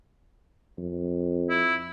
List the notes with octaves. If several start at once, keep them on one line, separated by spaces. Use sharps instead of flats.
F2
E4